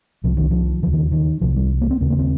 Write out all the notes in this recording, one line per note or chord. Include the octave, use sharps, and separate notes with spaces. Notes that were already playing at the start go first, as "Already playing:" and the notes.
C2 C3 F3
D#3
F3
D#2 C#3 F3
D#3
D#3
C2 C3 F3
G3
A#3
C4
D#2 C#3 C4
A#3
C4